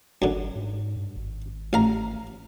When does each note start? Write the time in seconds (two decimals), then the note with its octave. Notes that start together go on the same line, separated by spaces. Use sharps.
0.22 G1 F#2 D3
0.55 G#2
0.96 G2
1.16 G#1
1.73 A1 F5 A#5